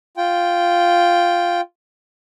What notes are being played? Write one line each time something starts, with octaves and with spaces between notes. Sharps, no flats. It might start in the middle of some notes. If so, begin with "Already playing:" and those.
F4 G5